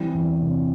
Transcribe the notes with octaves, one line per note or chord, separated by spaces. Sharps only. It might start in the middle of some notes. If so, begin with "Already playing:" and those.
Already playing: E3 G3 C4
E2
C3